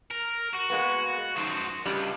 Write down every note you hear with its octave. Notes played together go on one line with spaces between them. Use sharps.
A#4
F#4
G#3 A#3 B3
F#2 D#3 F#4 C5
C#2 G3 D4